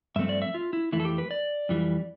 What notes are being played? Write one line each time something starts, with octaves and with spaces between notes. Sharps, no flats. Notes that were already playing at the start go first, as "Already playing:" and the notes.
G2 F3 A3 C4 E5
D5
E5
F4
E4
F2 E3 A3 E4
A4
G4
B4
D5
F2 E3 G3